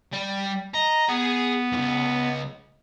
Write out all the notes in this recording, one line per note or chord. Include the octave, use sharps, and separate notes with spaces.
G3
D#5 A#5
B3 G#4 G#5
C#2 G2